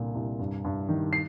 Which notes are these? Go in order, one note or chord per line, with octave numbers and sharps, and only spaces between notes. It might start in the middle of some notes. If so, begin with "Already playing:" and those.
Already playing: C2 A#2 D3
C2
G2
G2
D#3
C7